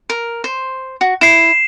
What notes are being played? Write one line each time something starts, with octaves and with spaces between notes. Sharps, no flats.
A#4
C5
F#4
E4 C7 E7